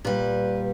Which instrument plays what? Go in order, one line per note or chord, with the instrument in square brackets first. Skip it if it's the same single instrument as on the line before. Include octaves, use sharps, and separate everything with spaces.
[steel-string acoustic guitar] A#2 G3 B4